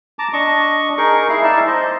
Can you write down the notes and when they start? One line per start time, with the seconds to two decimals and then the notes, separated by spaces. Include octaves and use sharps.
0.19 A5 A#5 D6
0.33 D4 D#5 C#6
0.98 D#4 G#4 A#4 C#6
1.29 E4 G#4 F5
1.43 D#4 D5 E5 A5
1.67 C5 D#5